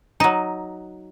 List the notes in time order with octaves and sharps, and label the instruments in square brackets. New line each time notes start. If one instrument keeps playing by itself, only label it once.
[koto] F#3 D#4